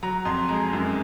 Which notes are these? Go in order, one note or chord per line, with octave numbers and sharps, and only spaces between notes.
F#3 A#5
F2 C6
G#3 A#5
F#2